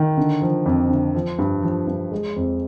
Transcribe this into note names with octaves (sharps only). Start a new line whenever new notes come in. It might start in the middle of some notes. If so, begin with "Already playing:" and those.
Already playing: D#3
D3
F3
F2
D3
F3
G2
F3
G2
G#3
F2